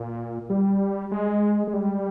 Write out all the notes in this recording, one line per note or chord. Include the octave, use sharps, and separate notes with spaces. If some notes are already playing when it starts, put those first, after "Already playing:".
Already playing: A#2
G3
G#3
G#3
G3